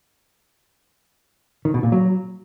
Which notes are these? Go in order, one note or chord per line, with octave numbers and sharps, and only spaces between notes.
D#3
B2
A#2
F#3